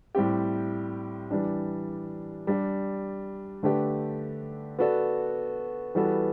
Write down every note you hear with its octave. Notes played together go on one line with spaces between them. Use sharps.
A2 G3 C4 G4
E3 G3 D4
G3 D4 G4
D3 A3 D4 G4 B4
B3 F#4 A4 D5
E3 G3 B3 F#4 A4